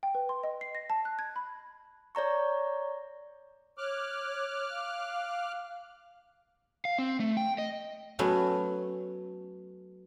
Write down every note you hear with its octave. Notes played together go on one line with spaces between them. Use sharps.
G5
B4
C6
D#5
C7
A#6
A5
F#6
G#6
B5
C#5 D5 A#5 C#6
C#5 D6 F6 F#6
F5
F5
C4
A3
G5
D#5
F#3 A3 B3 C#4